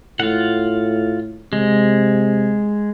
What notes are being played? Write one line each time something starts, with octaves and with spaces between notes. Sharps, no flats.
A2 F4 F#5
C3 G#3